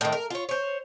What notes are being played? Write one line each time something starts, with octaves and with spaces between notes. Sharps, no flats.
A2 D#3
A#4
F4 C#5
C5 C#5